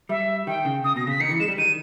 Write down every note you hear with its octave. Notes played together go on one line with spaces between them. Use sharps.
G3 E5
D#3 G5
C#3
C#3 D#6
B2 A#6
C#3 B6
D#3 C#7
E3
G#3 E7
G3
D#3 D#7